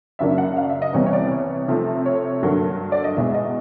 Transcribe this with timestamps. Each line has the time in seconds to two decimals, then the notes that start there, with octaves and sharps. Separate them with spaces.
0.19 F#2 C#3 F#3 A#3 D4 E5
0.38 F#5
0.57 F5
0.70 E5
0.82 D#5
0.93 C2 C3 E3 G3 B3 C#5
1.06 C#5
1.13 D5
1.31 C#5
1.68 C3 F3 A3
2.06 C#5
2.43 G2 D3 F#3 A#3
2.92 D5
3.04 D#5
3.16 E2 B2 G#3 E5
3.34 D#5